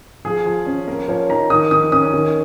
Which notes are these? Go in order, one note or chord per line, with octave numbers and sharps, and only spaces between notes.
F3 G#4
F3
C#4
A#3 A#4
F3 C#5
D#4 A#5
D#3 D#6
D#3 D#6
C#4 D#6
D#3